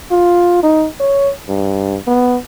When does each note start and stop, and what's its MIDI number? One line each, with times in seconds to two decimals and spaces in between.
0.11 0.59 65
0.63 0.87 63
1.00 1.31 73
1.49 1.98 43
2.08 2.38 59